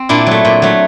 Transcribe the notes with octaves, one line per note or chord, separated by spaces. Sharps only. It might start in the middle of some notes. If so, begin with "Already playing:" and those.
Already playing: C4
A#2 D4 E4
F#3 A3
A#2
F#3 A3